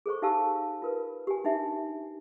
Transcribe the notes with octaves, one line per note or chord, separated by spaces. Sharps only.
G#4 A4 C5 C#6
D#4 G4 F5 G#5 A5 E6
F4 A#4 B4
G4 G#5
D4 D#4 G4 E5 G#5